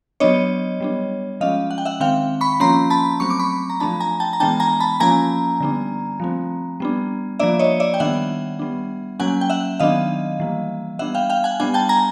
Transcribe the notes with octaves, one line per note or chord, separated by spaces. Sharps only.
F#3 B3 D4 C#5 D#5
G3 B3 D4
F3 G#3 C#4 D#5 F5
F#5
G5
E5 F#5
D#3 G#3 C4 F5 G5
B5 C#6
F3 A#3 C#4 A#5 C6
A5 B5
F#3 A3 C4 C#6
D6
B5 C#6
A#5
F3 A3 D4 A5 B5
G#5 A#5
G5 A5
A#5
E3 G#3 B3 D4 G5 A5
G#5 A#5
A5 B5
F3 A#3 C#4 G#5 A#5
D3 G3 B3 D4
F3 A3 C4
G3 B3 D4
F3 A#3 D4 D5 E5
C#5 D#5
D5 E5
G5
D#3 G3 B3 D4 E5 F#5
G3 B3 D4
F#3 A#3 C#4 F#5 G#5
G5
E5 F#5
D#3 F#3 B3 D4 D#5 F5
E3 G3 A#3
G3 B3 D4 E5 F#5
F5 G5
F5 G5
F#5 G#5
G3 B3 D4 F#5 G#5
G5 A5
G#5 A#5